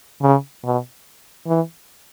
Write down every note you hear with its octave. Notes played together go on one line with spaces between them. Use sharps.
C#3
B2
E3